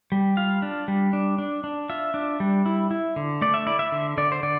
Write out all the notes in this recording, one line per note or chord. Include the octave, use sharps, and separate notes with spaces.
G3
F4 F5
D4
G3
D4
D4
D4
F4 E5
D4
G3
E4
E4
D3
A3 D5
E5
E4 D5
E5
D3
D3 D5
C5
D3 D5